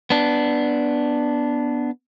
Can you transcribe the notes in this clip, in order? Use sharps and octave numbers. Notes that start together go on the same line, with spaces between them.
B3 D4